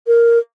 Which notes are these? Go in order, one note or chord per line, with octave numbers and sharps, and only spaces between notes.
A#4